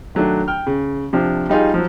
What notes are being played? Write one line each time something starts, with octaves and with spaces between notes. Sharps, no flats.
D#3 F#3 A3 D4
G5 F6
C#3
C3 F3 D4
G3 D#4 F4 G#4
F3 F#3